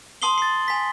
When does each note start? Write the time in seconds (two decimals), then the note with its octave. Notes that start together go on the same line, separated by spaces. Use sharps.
0.22 A5 C6 D#6 C7 F#7 G7
0.38 A6 C7
0.68 G#5 B6